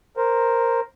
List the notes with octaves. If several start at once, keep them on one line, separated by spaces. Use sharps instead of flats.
A#4 C5